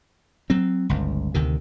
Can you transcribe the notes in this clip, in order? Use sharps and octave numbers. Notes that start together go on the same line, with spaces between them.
F#3 C4
G1 C#2
D2 C3 D#3